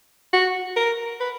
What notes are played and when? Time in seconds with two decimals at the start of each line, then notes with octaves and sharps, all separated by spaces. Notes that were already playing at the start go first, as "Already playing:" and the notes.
0.33 F#4
0.76 A#4
1.20 B4